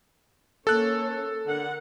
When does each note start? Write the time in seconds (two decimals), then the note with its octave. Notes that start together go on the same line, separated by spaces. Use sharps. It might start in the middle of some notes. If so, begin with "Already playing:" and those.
0.67 A#3 C#4 A4 C#5 F#6
1.46 D3 A#4 F#5